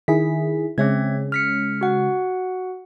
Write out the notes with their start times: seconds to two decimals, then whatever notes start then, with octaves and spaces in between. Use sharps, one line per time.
0.08 D#3 E4 G#4 B6
0.78 C#3 G#3 C4 C#4 E5 G#6
1.32 F6 B6 C#7
1.81 F#4 F#5